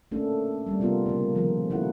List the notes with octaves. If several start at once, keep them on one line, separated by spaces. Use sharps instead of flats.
A3 A#3 C#4 D4 A4
G3 A#3 C4
C3 B3 F4 A#4
C#3 A#3
D#3 F3 F4 G#4 A#4
F#3 A#3 E4 A4 F#5